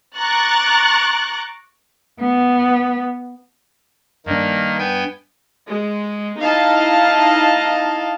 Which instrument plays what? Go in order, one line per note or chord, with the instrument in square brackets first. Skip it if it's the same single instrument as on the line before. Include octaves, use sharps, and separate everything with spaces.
[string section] A#5 C#6 D6 F#6 A6
[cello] B3
[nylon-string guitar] G2 D4 [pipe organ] D#3 A#3
[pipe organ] B3 G5 G#5
[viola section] G#3
D#4 E4 D#5 F5 A5